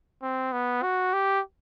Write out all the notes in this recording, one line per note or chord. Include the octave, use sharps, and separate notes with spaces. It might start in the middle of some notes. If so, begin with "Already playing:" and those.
C4
B3
F#4
G4